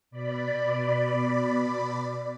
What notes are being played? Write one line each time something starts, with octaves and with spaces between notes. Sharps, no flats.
B2 D5 B5